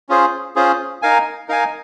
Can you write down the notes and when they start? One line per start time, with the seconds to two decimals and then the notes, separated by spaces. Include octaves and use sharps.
0.09 C#4 F4 G#4 C5
0.56 C#4 F4 G#4 C5
1.02 D#4 A#4 F5 G#5
1.49 D#4 A#4 F5 G#5